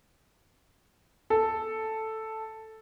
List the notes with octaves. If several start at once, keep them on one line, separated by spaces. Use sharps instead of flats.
A4